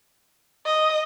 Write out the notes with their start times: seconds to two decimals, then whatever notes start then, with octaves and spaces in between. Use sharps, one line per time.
0.65 D#5